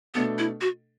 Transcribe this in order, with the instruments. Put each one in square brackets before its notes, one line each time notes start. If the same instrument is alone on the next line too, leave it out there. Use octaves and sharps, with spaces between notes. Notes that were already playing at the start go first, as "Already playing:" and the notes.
[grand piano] B2 A3 D4 A4 [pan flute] B3
[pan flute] E4
F#4